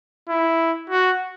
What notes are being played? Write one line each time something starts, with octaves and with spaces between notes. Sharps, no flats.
E4
F#4